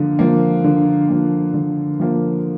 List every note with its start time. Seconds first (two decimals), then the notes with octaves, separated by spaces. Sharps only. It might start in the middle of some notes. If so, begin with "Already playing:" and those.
Already playing: D3 F3 A#3
0.19 F3 A#3
0.64 D3
1.09 F3 A#3
1.54 D3
2.00 F3 A#3